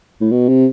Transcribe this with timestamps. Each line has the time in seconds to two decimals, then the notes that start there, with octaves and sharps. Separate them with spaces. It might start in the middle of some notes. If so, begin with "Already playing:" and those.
0.21 A2
0.31 B2
0.48 C3